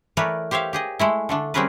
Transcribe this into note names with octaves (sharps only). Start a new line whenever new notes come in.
E3 A3 A#4 B4 C#5 D5
G4 C5 C#5 E5 F5
G4 G#4 D#5
G#3 A3 E4
D3 A3 D4
G3 C4 C#4 G#4 A#4 B4